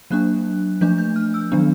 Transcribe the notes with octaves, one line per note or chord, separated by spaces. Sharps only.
F#3 A#3 D4 F#6
F3 A3 D4 G6
G6
F6
E6
D#3 F#3 B3 D4